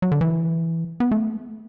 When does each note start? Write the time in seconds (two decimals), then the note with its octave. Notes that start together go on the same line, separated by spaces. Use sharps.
0.02 F#3
0.12 D3
0.21 E3
1.00 B3
1.11 A3